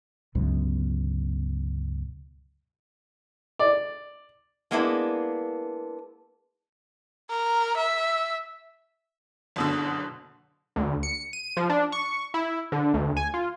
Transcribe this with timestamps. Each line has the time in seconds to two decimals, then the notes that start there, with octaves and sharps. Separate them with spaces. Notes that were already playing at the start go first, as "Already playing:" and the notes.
0.35 G1 C#2 B2 F#3
3.59 D5
4.71 G#3 A#3 B3 D4 E4
7.30 A#4
7.77 E5
9.56 F#1 B2 D3
10.76 D2
11.03 C#7
11.33 D#7
11.57 F3
11.70 D4
11.92 C#6
12.34 E4
12.72 D3
12.94 D2
13.17 G#5
13.34 F4